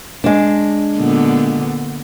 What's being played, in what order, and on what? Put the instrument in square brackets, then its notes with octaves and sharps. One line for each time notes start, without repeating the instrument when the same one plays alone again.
[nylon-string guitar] G#3 D4
[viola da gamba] A#2 D3 B3